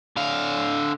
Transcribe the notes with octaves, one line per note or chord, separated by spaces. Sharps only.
D3 F5